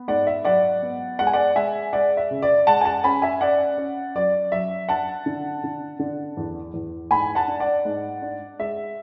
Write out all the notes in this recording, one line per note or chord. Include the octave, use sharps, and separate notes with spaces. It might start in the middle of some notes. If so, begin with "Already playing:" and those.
Already playing: B3
G#2 D5 F#5
E5
F#3 D5 F#5
B3
G#3 F#5
G#5
D5 F#5
G#3 E5 G#5
G#3 D5 F#5
E5
C#3
D5
G#3 F#5 A5
G#5
F#5 A5
C#4 G#5 B5
E5 G#5
C#4 D5 F#5
C#4
F#3 D5
F#3 E5
D4 F#5 A5
D3
D3
D3
E2
E2
G#2 G#5 B5
F#5 A5
D4
D5 F#5
G#2
D4
G#3 E5